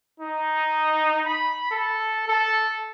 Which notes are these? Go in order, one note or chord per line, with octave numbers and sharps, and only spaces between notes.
D#4
B5
A4
A4